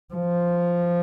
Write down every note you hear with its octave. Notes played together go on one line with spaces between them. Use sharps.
F3